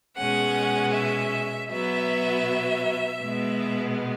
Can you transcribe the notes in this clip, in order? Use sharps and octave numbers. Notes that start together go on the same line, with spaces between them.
B2 G#3 C#4 F#5
E5
B2 F#3 B3 E5
B2 G#3 B3